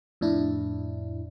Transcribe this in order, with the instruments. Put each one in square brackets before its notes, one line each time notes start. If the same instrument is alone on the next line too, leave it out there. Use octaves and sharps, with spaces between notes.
[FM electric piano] F2 A2 D4 E4